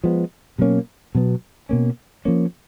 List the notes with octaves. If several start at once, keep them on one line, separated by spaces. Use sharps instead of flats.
F3 G#3 B3
B2 F#3 A#3 C#4
B2 F#3 B3
B2 A#3 C#4
F3 A#3 C#4